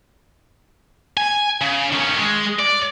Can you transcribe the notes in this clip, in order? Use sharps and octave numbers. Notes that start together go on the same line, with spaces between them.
G#5
C#3
D#3 C#4
G#3
D5